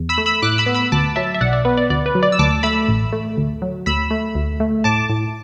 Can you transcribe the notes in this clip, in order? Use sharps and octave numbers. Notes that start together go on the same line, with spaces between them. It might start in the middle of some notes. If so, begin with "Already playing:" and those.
Already playing: E2
B5 E6
A3
B5 E6
A2 D6 F#6
B5 E6
B3
B5 E6
D2 A5 D6
F#3 E5 A5
E5
B1 D5 F#5
D5
B3 B4
D5
D2 D5
B4
F#3
D5
E6
D2 A5 D6
A3 B5 E6
A1
A3
D2
F#3
D2 B5 E6
A3
D2
A3
A2 A5 D6
A2